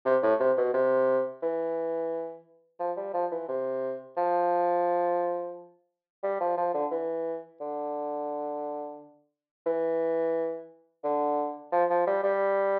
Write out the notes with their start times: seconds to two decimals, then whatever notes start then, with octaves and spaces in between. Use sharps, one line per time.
0.05 C3
0.23 A2
0.40 C3
0.57 B2
0.74 C3
1.43 E3
2.80 F3
2.97 G3
3.14 F3
3.32 E3
3.48 C3
4.17 F3
6.23 G3
6.41 F3
6.57 F3
6.74 D3
6.91 E3
7.61 D3
9.66 E3
11.04 D3
11.72 F3
11.90 F3
12.07 G3
12.23 G3